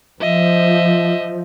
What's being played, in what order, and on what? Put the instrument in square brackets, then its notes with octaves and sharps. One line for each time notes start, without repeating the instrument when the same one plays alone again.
[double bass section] F3 [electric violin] D#5 E5